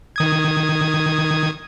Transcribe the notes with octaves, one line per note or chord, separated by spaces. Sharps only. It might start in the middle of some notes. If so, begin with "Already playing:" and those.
D#3 D#6 G#6